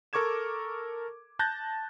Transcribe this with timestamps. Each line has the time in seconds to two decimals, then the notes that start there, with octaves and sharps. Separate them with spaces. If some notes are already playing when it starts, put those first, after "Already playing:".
0.13 A4 A#4 C#6 D6 G#6 E7
1.39 A5 F#6 G6 A6 A#6